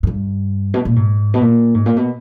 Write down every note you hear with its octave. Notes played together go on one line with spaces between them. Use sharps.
G#2
G2
B2
A#2
G#2
B2
A#2
G#2
A#2
B2